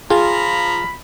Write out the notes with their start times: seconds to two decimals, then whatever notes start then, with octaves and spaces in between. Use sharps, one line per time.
0.10 F3 F4 G#4 A#5 B5